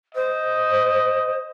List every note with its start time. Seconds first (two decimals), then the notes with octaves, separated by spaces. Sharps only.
0.15 C5 D#5